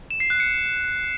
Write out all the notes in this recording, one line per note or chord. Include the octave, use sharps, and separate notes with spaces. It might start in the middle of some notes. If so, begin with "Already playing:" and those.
E7
C7
F#6
C#7